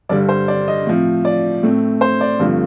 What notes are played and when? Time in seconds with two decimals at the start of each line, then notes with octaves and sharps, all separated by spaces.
0.09 G2 D3 G3 D5
0.29 C5
0.48 D5
0.68 D#5
0.87 A2 F3 C4
1.25 D5
1.63 A2 A3 C4
2.01 C5
2.21 D5
2.39 G2 D3 F3 A3 C4